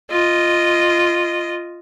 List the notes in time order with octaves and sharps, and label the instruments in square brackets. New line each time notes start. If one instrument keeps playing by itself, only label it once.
[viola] F4 D#5